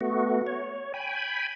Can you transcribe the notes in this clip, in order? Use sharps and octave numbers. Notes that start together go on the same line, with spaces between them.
A3 B3 F#4
C#5
G5 G#5 B5